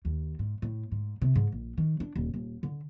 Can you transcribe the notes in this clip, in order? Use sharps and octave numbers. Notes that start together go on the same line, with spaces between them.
D#2
G#2
A2
G#2
C3
G#2
A#1
D#3
D4
D#1
D#1
D3